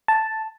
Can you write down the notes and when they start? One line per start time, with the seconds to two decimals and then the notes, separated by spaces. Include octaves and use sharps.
0.08 A5